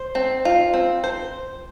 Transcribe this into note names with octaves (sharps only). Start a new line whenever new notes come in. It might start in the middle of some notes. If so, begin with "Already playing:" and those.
Already playing: C5
C4
F4
C4
C5